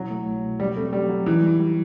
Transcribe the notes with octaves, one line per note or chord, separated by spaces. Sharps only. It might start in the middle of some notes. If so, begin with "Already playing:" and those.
Already playing: B2 F#3 E4
A3
C2
B2
F#3 G3
A3 C4
F#3 G3
F#3
E3 D#4
G3
G3